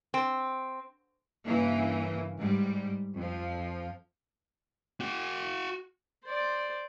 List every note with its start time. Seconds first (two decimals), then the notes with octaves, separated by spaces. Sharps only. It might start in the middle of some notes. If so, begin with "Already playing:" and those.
0.14 C4
1.46 G2 C#3 E3 A#3
2.39 G#2 G3
3.15 F2 F3
5.01 F#4 G5
6.24 C5 D5